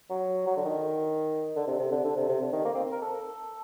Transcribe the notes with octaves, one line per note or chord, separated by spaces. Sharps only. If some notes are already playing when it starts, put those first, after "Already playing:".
F#3
F#3
D3
D#3
D3
C3
C3
D3
D3
C3
C3
D3
D#3
A#3
C4
A#4
A4